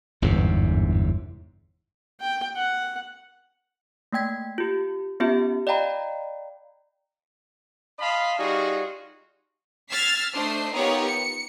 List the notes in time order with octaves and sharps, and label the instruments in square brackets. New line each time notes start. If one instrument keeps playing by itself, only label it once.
[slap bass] G1 E2 G#2 C3
[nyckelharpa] G5
F#5
[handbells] A3 A#3 G5 G#6 B6
F4 G4
B3 C#4 F4 G4 E5
D5 D#5 F5 G5 A#5 B5
[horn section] D#5 F5 A5 B5 C6
G3 D#4 F4 F#4 G#4
[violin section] E6 F6 G#6 A6 B6 C7
A3 D4 C5 D#5 C7
B3 D#4 F4 G4 A#4 C#5
C#7